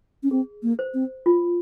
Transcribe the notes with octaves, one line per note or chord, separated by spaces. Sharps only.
C#4
C4 G#4
A#3
C5
C4
F4